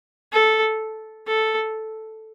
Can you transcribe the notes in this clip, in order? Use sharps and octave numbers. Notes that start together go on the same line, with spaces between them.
A4
A4